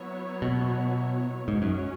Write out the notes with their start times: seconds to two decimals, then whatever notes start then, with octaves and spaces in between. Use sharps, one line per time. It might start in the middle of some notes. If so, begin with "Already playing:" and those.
Already playing: F#3 B3 E4 C#5
0.42 B2
1.48 G#2 F#3 C#4 F#4 C#5
1.62 F#2